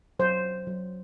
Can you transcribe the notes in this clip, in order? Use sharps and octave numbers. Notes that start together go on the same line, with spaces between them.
F#3 C5
F#3